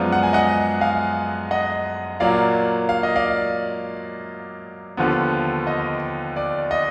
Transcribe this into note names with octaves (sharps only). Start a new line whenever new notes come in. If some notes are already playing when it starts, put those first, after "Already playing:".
Already playing: F#2 F3 G#3 B3 D5 F5
F#5
G#5
D#5 F#5
F5 G#5
D#5 F#5
A#2 F#3 A#3 D5 F5
F5
D#5
D5 F5
D#2 D3 F3 B3
D#5
D5
D#5